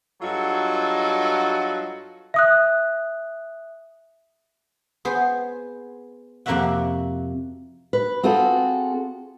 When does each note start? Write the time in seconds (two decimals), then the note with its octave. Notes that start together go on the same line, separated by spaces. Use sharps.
0.22 G2 F#3 F4 F#4 A4 D#5
2.34 E5 D#6 F#6
5.05 B3 G#4 C5
6.46 F2 C3 A#3 F#4 E5 F#5
7.93 B4
8.23 C4 F4 F#4 G#4 A4